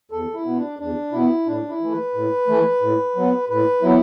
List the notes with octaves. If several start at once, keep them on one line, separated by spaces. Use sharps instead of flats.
E2 A4
E4
B2 B3
D4
E2 D4
B2 B3 E4
A2 D4
E4
E3 A3
B4
A2
E3 A3
A2
F#3 B3
A2 B4
F#3 B3 E4